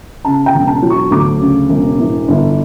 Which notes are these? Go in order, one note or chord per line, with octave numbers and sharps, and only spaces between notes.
C#3 A5
G5
E1
A5
F#3
C#6
D2 D6
C#3
E1
E3
G1